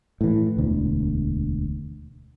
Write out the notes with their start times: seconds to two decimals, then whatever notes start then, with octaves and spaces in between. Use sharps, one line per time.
0.21 A2 E3
0.57 E1 D2